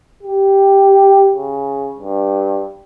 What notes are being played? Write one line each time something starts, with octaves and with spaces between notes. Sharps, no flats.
G4
C#3
G2